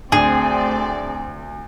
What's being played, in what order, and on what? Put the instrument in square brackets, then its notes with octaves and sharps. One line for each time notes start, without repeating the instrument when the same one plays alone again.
[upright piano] D2 [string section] A3 C4 D5 [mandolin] G#4